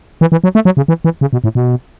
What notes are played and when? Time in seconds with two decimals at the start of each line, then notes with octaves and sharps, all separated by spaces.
0.21 E3
0.32 E3
0.44 F#3
0.55 A3
0.65 F#3
0.77 C#3
0.88 E3
1.05 E3
1.21 C#3
1.33 B2
1.44 A2
1.55 B2